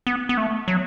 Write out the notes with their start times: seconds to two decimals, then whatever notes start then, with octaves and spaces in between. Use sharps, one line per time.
0.07 B3
0.29 B3
0.38 A3
0.68 F#3